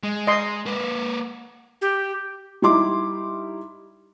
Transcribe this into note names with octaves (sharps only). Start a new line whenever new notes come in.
G#3
D#5 C6
A#3 B4
G4
G3 D#4 E4 C6 D6